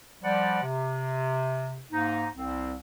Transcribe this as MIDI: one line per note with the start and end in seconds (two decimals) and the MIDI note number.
0.23 0.59 53
0.23 0.59 55
0.23 0.59 74
0.23 0.59 78
0.63 1.82 48
1.91 2.26 44
1.91 2.26 58
1.91 2.26 63
2.36 2.74 36
2.36 2.74 60